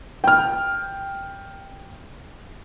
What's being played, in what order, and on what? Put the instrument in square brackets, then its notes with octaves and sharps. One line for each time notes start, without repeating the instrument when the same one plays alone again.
[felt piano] G5 F6